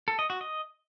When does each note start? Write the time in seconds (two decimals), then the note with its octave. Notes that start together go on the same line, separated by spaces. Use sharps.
0.08 A4
0.19 D#5
0.30 F#4
0.41 D#5